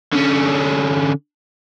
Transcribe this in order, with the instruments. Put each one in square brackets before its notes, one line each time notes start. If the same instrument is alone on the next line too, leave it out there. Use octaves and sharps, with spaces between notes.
[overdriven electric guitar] D3 C#4